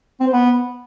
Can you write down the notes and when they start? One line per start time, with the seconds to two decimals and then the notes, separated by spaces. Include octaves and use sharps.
0.20 C4
0.27 C5
0.33 B3